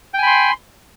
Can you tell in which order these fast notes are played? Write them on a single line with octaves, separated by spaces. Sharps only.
G5 G#5 B5 C6